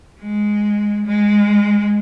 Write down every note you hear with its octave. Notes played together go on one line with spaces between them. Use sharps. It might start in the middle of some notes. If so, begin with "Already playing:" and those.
G#3
G#3